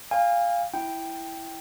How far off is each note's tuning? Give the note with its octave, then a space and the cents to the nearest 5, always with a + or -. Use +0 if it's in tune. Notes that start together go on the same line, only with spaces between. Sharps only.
F5 +0 G#5 -35
E4 +0 G5 +0